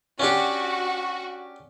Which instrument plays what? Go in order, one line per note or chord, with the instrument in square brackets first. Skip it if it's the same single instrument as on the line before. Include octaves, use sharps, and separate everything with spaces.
[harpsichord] C#4 D4 G4 [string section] F#4